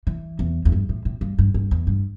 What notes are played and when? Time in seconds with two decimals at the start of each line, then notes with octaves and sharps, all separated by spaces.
0.07 E3
0.39 E2
0.65 E2
0.72 G2
0.89 A2
1.05 A2
1.21 G2
1.39 G2
1.54 G2
1.71 E2
1.87 G2